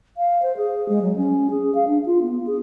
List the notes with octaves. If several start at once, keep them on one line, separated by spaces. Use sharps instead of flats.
F5
C5
G#4
G#3
F#3
C#4
G#4
F5
D4
F4
B3
G#4